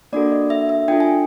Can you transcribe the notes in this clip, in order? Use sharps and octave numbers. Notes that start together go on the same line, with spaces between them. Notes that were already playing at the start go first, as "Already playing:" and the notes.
A#3 D4 F#4 A4 D5
D#5
E5
E5
D4 F4 A4 G5
G#5